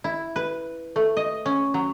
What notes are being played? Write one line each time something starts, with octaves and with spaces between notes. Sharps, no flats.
E4
B4
A3
D#5
C#4
F#3